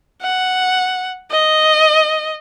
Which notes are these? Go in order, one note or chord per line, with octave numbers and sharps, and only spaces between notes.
F#5
D#5